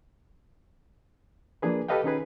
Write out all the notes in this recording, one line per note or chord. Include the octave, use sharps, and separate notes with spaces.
F3 A#3 D4 G#4 B4
G4 A4 B4 D#5 F5 G5
D#3 C#4 D#4 F#4 G#4 B4